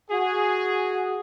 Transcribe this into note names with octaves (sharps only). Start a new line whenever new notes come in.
F#4 G#4